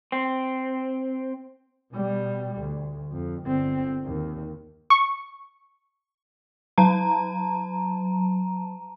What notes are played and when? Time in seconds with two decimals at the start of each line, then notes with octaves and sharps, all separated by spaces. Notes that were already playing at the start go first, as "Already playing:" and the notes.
0.12 C4
1.92 B2 G3
2.59 D2
3.12 F2
3.45 G1 C4
4.04 D#2
4.90 C#6
6.78 F#3 A5 A#5